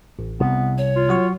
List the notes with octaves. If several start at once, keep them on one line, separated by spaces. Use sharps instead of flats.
A1
C2 C3 B3
C#5
F4
F#3 F#4 C#6